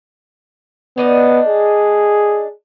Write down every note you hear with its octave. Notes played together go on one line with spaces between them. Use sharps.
B3 D4 D#4 D#5
G#4